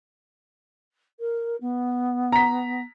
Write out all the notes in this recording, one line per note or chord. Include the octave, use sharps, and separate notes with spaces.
A#4
B3
A#5 B6